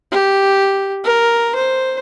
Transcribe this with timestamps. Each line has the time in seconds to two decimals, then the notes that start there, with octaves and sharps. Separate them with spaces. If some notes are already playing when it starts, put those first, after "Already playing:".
0.12 G4
1.04 A#4
1.56 C5